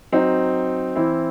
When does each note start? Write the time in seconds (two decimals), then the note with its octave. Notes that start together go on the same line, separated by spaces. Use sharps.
0.12 F#3 C4 D#4
0.96 E3 C4 E4